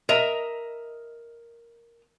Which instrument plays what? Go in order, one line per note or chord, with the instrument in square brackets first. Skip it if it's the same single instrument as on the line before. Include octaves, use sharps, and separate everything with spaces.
[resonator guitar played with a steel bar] A#4 D#5 E5 A#5